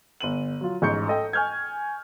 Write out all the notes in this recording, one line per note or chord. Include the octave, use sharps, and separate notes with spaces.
G1 D#7 F#7
F#3 F4
A1 G#2 C#6 G6 C#7
A4 D#5 G5
G#5 C#6 F6 G6 G#6